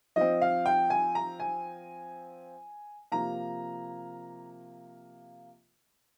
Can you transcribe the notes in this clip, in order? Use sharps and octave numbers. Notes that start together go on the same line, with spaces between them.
F3 C4 D#5
F5
G5
G#5
A#5
G#5
C3 F3 A#3 A#5